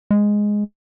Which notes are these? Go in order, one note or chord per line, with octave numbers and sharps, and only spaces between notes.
G#3